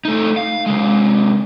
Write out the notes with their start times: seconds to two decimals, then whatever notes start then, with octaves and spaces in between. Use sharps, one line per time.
0.05 A3 D#4
0.37 F5
0.66 C3 G#3